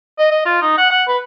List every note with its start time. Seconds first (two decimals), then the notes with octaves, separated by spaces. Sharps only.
0.19 D#5
0.31 D#5
0.46 F4
0.62 D#4
0.78 F#5
0.91 F#5
1.08 B4